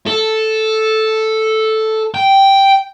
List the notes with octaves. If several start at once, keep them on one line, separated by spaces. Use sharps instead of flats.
A4
G5